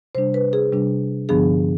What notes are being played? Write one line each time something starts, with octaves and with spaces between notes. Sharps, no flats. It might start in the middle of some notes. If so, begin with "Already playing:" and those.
C3 G3 D4 C5
B4
G#4
C3 G3 D4
G2 D3 F3 B3 D4 G#4